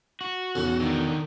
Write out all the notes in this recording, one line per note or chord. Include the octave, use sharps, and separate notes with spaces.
F#4
B1 E2 C#4
D3 D#3